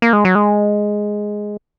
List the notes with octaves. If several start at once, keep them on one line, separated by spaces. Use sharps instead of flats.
A#3
G#3
F#3
G#3